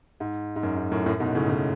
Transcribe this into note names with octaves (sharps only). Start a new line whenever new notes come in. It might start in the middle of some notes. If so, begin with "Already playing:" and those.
G#2
G#2
F#2
G#2
F#2 A2
F#2 A2
G#2 B2
A2 C#3
A2 C#3